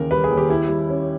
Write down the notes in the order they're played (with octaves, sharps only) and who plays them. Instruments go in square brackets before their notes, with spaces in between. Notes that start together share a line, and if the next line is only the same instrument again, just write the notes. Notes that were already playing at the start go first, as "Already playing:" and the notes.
Already playing: [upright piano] D#2 C#3 E3 [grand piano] A#4
[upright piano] G3 [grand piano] B4
[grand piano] G#4
[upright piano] D#2
[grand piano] G4
[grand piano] E4 [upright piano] G4
[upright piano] G3
C#4